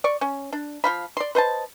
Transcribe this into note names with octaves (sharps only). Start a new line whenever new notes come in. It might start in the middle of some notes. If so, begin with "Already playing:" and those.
D5 C#6
C#4
D4
F3 F5 B5
D5 C6
B4 C5 D#5 A5